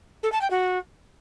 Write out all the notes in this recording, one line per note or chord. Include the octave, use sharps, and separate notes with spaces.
A4
A5
G5
F#4